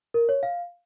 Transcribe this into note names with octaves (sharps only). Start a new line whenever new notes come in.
A#4
C#5
F5